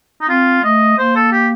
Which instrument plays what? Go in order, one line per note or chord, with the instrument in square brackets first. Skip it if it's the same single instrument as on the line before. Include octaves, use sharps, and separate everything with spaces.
[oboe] D#4
[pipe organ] C4 [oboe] F4
[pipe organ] A3 [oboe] D#5
[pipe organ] A#3 [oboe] C5
[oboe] A4
G4